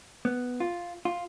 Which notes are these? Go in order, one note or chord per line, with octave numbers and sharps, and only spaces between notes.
B3
F4
F4